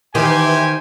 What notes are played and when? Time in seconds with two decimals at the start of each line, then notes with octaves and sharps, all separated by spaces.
0.15 D#3 E3 G4 C5 G#5